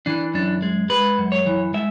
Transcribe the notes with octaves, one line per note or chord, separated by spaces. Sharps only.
E3 D4
F#2 D4
G#3
G#3 B4
F#2
C#5
E3
G#3 E5